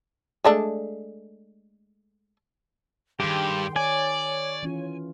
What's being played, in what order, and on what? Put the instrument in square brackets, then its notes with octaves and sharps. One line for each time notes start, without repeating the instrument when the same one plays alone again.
[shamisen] G#3 A3 D4
[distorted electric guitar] G2 [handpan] D#3 G#4 [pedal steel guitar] G4 [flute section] G5 C6
[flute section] C#5 [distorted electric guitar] D5 [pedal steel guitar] G#5
[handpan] E3 C#4 F4